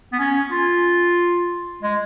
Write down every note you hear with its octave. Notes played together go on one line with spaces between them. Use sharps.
B3
C#4
F4
G#3